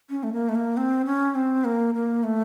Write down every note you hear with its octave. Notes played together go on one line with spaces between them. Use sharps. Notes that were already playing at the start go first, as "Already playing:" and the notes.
C#4
A3
A#3
A3
A#3
C4
C#4
C4
A#3
A#3
A3